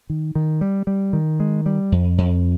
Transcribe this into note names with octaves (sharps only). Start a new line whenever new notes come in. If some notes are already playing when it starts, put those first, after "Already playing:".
D#3
D#3
G3
G3
D#3
G#3
G3
F2
F2